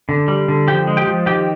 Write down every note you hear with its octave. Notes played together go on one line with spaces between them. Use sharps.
D3
G3
D3
F3 G4 G5
G#3
G4 G5
F3
D#3 G4 G5